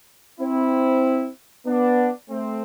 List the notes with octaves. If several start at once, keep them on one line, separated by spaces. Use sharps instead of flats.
C4 E4
B3 D4
A3 C4